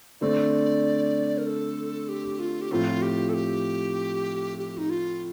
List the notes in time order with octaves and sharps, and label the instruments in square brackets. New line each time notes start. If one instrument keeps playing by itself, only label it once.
[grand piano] D3 A3 C4 [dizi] D5
[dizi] A#4
A4
G4
F4
G4
[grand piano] A2 F3 C4 [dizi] F4
[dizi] G4
A4
G4
G4
D#4
F4